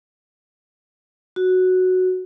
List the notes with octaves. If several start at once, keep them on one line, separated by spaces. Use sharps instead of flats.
F#4